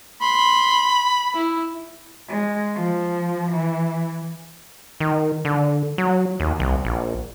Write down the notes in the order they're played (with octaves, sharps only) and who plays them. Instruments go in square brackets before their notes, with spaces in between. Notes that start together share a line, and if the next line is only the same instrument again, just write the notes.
[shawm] B5 [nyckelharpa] C6
[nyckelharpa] E4
[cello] G#3
F3
E3
[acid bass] D#3
D3
F#3
D#2
C2
A#1